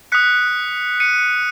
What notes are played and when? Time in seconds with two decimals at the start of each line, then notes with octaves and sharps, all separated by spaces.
0.12 D#6 F#6 B6 C#7
1.00 C#7 D#7